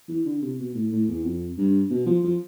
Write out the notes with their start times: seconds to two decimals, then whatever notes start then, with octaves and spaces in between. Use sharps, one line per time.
0.09 E3
0.25 D3
0.42 C3
0.59 B2
0.74 A2
0.91 A2
1.08 E2
1.24 F2
1.57 G2
1.90 B2
2.06 F3
2.23 F3